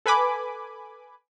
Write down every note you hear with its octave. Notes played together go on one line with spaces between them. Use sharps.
A4 B4 G#5 B5 D6